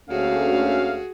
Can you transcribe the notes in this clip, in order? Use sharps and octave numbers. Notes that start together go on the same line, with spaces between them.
D2 A3 A#3 C#4 F#4 G#4 F5